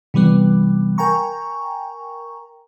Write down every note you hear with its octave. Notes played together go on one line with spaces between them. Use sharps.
C3 E3 G3 B3
A#4 G5 G#5 A#5 C#6